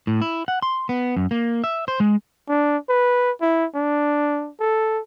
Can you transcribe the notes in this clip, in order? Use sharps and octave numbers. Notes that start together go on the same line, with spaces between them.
A2
E4
F#5
C6
B3
F#2
A#3
E5
C5
G#3
D4
B4
E4
D4
A4